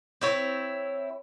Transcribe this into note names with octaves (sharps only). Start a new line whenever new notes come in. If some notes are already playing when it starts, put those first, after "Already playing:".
C4 E4 C#5